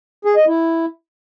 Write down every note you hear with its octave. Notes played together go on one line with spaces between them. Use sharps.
G#4
D#5
E4